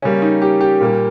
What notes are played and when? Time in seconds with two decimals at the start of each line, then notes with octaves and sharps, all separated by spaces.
0.02 C#3 G3 A#3 C#4
0.22 D#4
0.42 G4
0.61 G4
0.81 A#2 G3 A#3